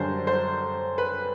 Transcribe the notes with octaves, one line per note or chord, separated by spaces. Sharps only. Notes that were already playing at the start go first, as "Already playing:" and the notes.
Already playing: F#2 D3 G3 C5
C5
B4